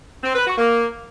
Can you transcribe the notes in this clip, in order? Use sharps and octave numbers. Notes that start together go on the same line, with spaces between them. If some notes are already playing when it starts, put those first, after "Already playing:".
C4
B4
F#4
A#3